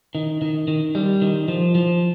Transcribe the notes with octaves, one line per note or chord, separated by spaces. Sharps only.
D#3
D#3
D#3
G3
D#3
F3
F3